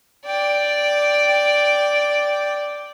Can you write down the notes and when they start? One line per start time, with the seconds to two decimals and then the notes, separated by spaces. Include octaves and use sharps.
0.25 D5 G5